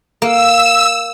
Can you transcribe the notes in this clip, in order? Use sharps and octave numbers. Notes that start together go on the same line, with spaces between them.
A#3 E6